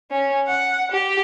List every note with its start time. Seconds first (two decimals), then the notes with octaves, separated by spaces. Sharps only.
0.11 C#4
0.47 F#5
0.92 G4